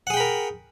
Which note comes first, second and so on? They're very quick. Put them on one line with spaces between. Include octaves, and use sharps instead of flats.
F#5 G#4 G5 B5 A#4